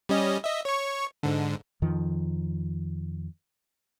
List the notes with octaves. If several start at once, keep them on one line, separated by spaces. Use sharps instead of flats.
G3 C#4 D#5
D#5 E5
C#5 C#6
G#2 D3
F2 D#3 F3